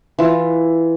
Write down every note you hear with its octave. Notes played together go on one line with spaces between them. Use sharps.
E3 F4